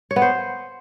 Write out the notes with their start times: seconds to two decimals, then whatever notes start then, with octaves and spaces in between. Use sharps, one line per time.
0.11 C#5
0.16 B3
0.22 C5